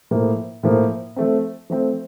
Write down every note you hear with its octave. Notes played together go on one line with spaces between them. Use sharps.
A2 F3 A#3
A2 F3 A#3
F3 A3 C4
F3 A3 C4